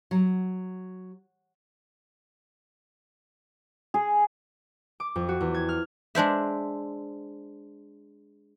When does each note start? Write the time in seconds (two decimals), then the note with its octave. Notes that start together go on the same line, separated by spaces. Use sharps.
0.11 F#3
3.94 G#4
5.00 D6
5.16 F2
5.29 F#4
5.41 E2
5.54 G#6
5.69 F6
6.15 G#3 D4 C5 E5